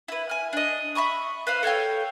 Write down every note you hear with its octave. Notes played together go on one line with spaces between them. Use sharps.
E4 B4
G#5 F6
D4 D#5
E5 B5 C#6 D#6
B4 C5 F5
A4 C#5 F5 G5